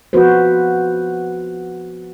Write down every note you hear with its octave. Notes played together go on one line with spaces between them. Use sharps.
F3 B3 F#4 B4 C5